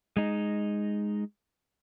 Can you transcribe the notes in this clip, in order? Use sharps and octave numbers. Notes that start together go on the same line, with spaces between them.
G#3 D#4